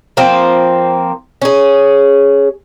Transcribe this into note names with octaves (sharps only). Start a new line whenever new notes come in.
F3 A#3 C4
C#4 G#4